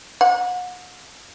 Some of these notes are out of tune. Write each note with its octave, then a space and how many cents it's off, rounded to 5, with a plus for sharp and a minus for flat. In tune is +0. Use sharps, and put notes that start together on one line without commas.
F#5 -35